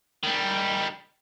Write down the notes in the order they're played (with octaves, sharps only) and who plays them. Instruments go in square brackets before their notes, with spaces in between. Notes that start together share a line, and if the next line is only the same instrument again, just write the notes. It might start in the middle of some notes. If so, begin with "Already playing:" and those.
[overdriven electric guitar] D#3 G3